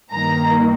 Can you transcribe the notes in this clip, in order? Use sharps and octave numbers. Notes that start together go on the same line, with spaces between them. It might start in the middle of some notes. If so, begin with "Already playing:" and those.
G2 D#3 A#3 A#5